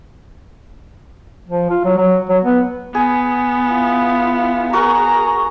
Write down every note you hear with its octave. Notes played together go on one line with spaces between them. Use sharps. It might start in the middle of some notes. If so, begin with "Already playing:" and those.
F3
F4
F#3
F#3
F#3
B3
B3 G#4
E4 F4
F#4 G#4 A#4 A#5 C#6